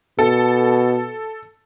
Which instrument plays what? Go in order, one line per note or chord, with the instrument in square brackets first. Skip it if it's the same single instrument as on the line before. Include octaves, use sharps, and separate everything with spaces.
[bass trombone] B2 [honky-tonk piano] A4